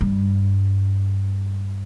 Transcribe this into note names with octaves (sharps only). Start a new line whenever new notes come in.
G2